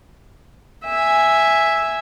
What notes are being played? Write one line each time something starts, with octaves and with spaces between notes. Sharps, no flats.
E5 G#5